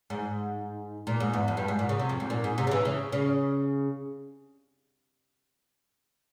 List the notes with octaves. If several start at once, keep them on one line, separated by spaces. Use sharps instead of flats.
G#2
A#2
G#2
E2
F2
G2
G#2
A#2
C#3
C3
F2
G#2
A#2
G#2
C3
C#3
E3
C#3
C#3